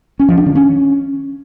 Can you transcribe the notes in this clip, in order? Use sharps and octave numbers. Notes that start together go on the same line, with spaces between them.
C#4
F3
D4
D#3
C#4